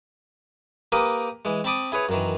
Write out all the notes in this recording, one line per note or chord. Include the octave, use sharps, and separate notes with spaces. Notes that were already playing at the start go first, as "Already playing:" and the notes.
A#3 G4 A#4 B4 D#6
E3 G#3
C4 A5 B5 D6 D#6
E4 G#4 B4 C#5
F#2 D#3 E3